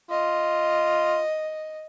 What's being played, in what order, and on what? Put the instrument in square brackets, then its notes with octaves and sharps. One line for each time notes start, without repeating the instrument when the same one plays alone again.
[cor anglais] F4 [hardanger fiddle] D#5